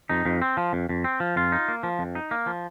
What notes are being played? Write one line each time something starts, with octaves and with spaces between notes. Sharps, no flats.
F2 D#4
F2
C4
F3
F2
F2
C4
F3
F2 F4
D#4
A#3
F3
F2
D#4
A#3
F3